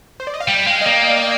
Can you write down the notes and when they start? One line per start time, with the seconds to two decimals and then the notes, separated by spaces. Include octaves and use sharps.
0.20 C5
0.27 D5
0.34 D#5
0.40 F5
0.47 G3 G5
0.67 G#3 F5
0.81 D#5
0.86 A#3 D5